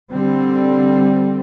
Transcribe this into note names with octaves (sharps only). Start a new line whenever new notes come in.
D3 G3 C4